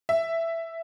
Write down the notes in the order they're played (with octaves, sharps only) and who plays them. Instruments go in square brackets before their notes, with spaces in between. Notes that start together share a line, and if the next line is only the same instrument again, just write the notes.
[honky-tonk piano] E5